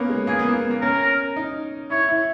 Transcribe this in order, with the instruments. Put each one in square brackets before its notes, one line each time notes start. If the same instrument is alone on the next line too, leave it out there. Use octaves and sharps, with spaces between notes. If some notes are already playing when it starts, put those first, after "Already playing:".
Already playing: [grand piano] A#3 B3 C#4
G#3
[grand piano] A#3 [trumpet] G#4
[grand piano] B3
A#3
B3
A#3
[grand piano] C#4 [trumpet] A#4
[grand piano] D#4
[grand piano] E4 [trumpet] C#5
[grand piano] E4